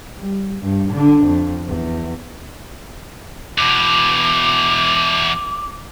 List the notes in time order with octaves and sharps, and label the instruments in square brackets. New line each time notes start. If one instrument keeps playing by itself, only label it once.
[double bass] G3
G2
D3 D4
F2
E2
[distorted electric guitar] E2 B2 [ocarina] D6